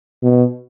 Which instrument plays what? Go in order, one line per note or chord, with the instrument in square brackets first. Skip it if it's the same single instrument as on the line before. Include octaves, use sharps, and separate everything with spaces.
[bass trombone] B2